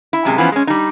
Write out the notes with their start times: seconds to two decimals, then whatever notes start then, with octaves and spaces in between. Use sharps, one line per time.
0.13 E4
0.25 F#2 C3 G#3
0.38 E3 F3 B3 C#4
0.52 G#3 C#4
0.67 G3 D#4